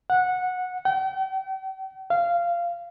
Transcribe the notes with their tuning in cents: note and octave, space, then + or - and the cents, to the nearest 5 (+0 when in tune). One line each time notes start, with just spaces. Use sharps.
F#5 -15
G5 -45
F5 -15